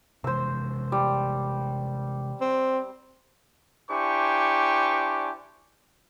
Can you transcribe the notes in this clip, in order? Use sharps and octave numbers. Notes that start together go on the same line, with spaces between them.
C3 E3 G#3 C5 E6
G3
C4
D4 E4 G4 C5 G#5 C#6